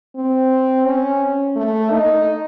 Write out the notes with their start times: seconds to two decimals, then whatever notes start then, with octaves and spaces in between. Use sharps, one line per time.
0.16 C4
0.86 C#4
1.56 A3
1.92 D#4